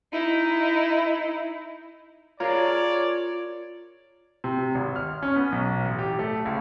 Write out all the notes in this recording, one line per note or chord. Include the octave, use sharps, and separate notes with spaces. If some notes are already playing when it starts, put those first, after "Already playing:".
D#4 E4
F4 G#4 A#4 C#5 D5 A#5
C3
G#1
F6
C#4
B3
B1
A1
G4
A3
C#2